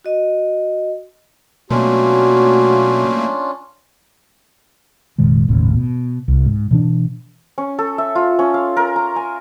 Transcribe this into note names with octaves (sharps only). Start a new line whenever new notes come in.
F#4 D#5
B2 F#3 A3 A#3 C#4 D4 F4 F#4
F1 A#2 D#3 G#3
G1 D#2 A2 C#3
B2
C2
G#2
B2 E3 C4 D4
C#4
A4
E5
F4
C#4
F5
A#4
A#5
G#5